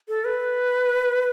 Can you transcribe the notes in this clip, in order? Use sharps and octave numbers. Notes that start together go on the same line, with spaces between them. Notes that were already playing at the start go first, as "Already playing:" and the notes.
A4
B4